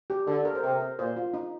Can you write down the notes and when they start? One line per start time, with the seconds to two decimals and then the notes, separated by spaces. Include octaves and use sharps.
0.10 G4
0.27 D3 A4
0.45 A#4
0.55 C5
0.63 C3 A#4
0.81 C5
0.98 A#2 C5
1.16 F4
1.34 D#4